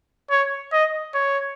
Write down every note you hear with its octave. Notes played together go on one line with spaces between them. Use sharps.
C#5
D#5
C#5